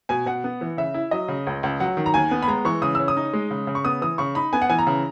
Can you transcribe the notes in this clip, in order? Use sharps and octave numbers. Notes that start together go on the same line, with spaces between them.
B2 G#5
B2 F#5
B3
E3
C#3 E5
E4
F#3 D#5
C#3
C#2
C#2
F#3 F#5
D#3
A#5
D#2 G#5
B3
B5
G#3 A#5
E3 C#6
C#3 D#6
C#4 E6
D#6
D#4
G#3
C#3
C#3
C#6
B3 D#6
E3 D#6
C#3 C#6
D#4 B5
B3 G#5
F#5
E3 G#5
A#5
C#3